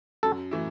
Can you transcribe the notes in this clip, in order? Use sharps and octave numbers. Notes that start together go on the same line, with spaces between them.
F#2 A4
E3 A3 E4